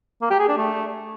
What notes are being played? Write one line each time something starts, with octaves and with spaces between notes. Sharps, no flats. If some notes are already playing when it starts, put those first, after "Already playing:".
A#3
G4
G#4
D4
A3